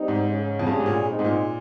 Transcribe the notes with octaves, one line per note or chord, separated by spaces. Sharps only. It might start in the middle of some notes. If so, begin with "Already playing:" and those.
Already playing: G3 C4 D#4
G#2
C#3 G#3 C#4
F2
G2 C#3 G3 C#4 G#4
G#2
A#2
G#3 C4 D#4
G#2
A#2